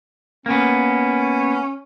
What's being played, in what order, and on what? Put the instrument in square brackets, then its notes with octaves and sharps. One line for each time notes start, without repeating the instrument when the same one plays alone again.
[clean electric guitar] A#3 B3 [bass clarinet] C#4